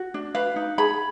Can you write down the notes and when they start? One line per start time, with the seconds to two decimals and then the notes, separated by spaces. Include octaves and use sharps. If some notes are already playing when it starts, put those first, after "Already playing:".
Already playing: F#4
0.14 D4
0.35 B4 F5
0.56 D#4
0.78 G#4 B5